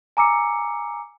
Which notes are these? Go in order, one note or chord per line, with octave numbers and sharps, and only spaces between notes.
G#5 A#5 D6 E6 C#7